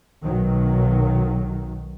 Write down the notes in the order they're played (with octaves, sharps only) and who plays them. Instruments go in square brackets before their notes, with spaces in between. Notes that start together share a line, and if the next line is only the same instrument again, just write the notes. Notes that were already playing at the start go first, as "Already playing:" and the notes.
[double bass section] B1 D#3 F#3